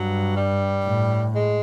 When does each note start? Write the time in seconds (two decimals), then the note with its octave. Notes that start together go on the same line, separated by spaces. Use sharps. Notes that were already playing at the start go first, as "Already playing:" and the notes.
Already playing: G2 F#3
0.36 G3
0.86 A2
1.35 G#3